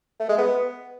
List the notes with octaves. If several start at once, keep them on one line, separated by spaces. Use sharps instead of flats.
A3
G#3
B3